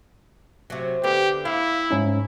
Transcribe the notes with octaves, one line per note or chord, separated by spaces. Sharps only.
C3 F#3
D3 B3 G4
E4 F5
G#2 C#4 D#4